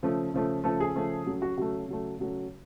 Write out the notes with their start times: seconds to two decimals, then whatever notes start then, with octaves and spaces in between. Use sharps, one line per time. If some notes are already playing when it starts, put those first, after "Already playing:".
0.03 C#3 F3 A3
0.34 C#3 F3 A3
0.64 C#3 F3 A3 A4
0.80 G#4
0.95 C#3 F3 A3
1.26 C#3 F#3 A3
1.42 F#4
1.57 C#3 F#3 A3 F#4
1.88 C#3 F#3 A3
2.19 C#3 F#3 A3